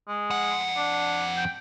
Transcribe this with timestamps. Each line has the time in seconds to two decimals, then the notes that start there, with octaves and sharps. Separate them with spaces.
0.08 G#3
0.31 F2 F#5
0.76 D4
1.37 G5